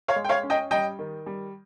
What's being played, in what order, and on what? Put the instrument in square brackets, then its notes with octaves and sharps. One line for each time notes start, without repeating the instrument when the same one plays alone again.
[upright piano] C#5 F5
G#3
G5
C#5 F5
C#4
D#5 G5
G3 D#5 G5
D#3
G3